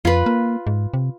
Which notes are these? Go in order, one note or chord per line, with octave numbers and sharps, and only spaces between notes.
F2 F4 B4
A#3
G#2
C3